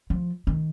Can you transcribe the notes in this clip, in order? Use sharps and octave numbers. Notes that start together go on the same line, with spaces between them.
F3
D#3